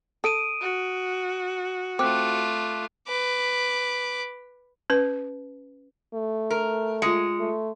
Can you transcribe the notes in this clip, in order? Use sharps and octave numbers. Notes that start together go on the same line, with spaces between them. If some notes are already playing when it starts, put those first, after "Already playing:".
A4 D#6 D7 D#7
F#4
A3 C4 F4 D6 F#6
B4 D6
C#4 B4
A3
A#4
G#3 F4 C#7
A3